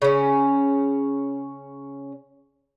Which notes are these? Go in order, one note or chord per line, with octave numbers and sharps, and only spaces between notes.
C#3 C#4